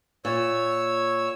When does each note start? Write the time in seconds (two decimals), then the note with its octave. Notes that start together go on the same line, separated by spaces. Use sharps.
0.25 A#2 C#5 E6